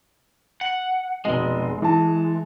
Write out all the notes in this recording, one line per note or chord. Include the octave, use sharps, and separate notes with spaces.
F#5
F1 B2 G#3 D#5
E3 A5